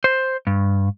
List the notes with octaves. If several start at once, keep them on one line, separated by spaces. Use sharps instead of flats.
C5
G2